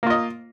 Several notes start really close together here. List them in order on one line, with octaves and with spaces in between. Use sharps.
A#3 F4 D#5